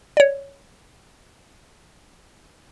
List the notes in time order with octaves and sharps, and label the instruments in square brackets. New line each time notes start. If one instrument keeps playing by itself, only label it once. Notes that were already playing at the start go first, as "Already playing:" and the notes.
[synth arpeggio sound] C#5 D5